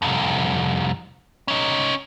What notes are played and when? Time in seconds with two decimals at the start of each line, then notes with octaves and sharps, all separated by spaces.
0.02 C2 F2
1.48 C#4 D#4